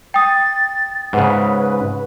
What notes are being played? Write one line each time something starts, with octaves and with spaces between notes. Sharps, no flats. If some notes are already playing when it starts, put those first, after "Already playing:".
G5 D#6 A6
G#2 C#3 B4 F#5